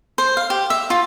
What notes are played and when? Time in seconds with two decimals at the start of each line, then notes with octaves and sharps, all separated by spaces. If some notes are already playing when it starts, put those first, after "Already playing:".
0.18 C5
0.37 F5
0.50 G4
0.70 E5
0.90 F4